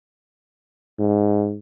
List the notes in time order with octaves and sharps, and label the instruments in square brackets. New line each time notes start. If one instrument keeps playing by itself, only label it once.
[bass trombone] G#2